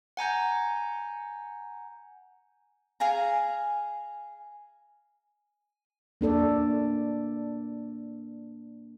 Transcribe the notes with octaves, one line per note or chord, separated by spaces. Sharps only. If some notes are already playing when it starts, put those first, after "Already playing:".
F#5 G#5 A#5 G6
G#4 F5 G#5 A#5
A#3 D4 A4 D5